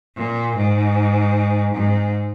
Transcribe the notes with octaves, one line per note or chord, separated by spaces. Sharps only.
A#2
G#2
G#2